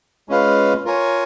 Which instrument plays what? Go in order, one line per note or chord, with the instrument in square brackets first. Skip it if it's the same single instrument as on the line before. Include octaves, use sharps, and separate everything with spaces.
[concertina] G#3 C#4 F4 B4 F5
F4 A#4 C#5 G#5